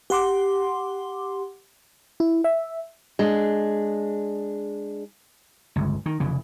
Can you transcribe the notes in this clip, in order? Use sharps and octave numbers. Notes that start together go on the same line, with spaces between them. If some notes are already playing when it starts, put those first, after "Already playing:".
G4 F#5 C6 D6
E4
E5
G#3 D4
G1 C#2
D#3
F1 C#3 E3